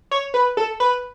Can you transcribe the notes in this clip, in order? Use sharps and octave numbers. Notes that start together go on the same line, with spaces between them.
C#5
B4
A4
B4